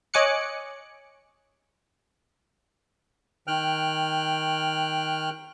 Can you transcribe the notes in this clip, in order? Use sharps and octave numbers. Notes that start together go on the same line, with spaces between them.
C#5 D#5 G#5 D6 F#6 C#7
D#3 G5 F6 F#6